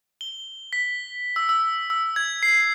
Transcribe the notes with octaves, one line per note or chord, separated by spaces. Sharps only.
G7
B6
E6
E6
E6
G#6
C7